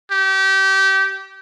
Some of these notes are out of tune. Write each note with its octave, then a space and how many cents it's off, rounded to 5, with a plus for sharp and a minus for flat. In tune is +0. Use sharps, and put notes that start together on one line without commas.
G4 -25